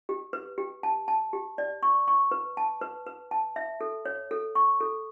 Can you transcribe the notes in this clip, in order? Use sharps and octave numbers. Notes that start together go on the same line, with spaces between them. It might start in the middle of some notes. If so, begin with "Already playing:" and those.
G4
B4
G4
A5
A5
G4
D5
C#6
C#6
B4
A5
B4
B4
A5
E5
A4
C#5
A4
C#6
A4